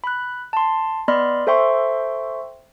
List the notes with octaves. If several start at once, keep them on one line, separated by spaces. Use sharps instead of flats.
B5 F#6
A5 C6
B3 D5 D#5 B5 C6 F6
A4 C5 E5 G5 C6 C#6